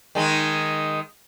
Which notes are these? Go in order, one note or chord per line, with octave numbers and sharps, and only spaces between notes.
D#3 G#3 D#4